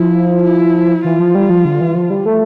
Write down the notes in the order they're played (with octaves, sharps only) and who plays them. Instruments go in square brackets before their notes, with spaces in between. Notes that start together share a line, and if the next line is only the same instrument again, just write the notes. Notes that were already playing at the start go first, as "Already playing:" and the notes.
Already playing: [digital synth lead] F3 [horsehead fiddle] E4
[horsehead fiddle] E4
[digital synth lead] E3 [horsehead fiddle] F4
[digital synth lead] F3
G3
F3
D3
E3
F3
G3
A3